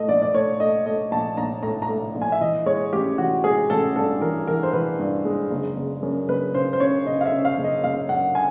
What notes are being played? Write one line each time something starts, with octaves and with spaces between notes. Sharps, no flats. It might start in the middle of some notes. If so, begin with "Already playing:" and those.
Already playing: A2 A3 D#5
A#1 D5
D5
A3 C#5
A3 D#5
A3 D#5
A#1 A5
A#1 A#5
A2 A#5
A#5
A2
A#1
G#5
E5
E3 D#5
G#3 C#5
A1 G4
E3 F#4
G#3 G#4
A1 A4
G2 A4
E3 A#4
E3 A#4
C5
E3 B4
G2
G#3
F#1
F#1
F#2
F#1 B4
C#3 C5
C5
C#3 C#5
C#3 D#5
F5
E5
C#3
F5
F#1
D#5
F#1 F5
F#2 F#5
G#5